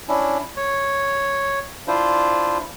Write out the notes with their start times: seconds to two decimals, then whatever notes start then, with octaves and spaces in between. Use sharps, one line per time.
0.08 C#4 D4 E4
0.57 C#5
1.88 D4 E4 F4 C5